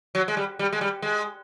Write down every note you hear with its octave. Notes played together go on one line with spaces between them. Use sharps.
F#3
G#3
G3
G3
G#3
G3
G#3